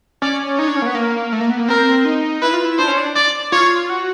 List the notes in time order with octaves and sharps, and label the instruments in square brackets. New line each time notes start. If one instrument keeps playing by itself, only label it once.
[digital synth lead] C#4 [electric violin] D5
[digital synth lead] D#4 [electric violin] C#5
[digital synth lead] D4
C#4
A#3
B3
A#3
A3
A#3
B3
A#3
[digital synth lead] C4 [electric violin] A#4
[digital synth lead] D#4
[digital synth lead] E4 [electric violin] B4
[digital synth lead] F4
E4
[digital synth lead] D4 [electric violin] C5
[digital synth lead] C#4
D4
[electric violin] D5
[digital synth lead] F4 [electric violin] C#5
[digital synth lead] F#4